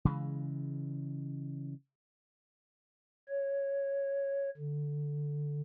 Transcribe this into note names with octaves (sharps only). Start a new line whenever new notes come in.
C#3 E3 G#3
C#5
D3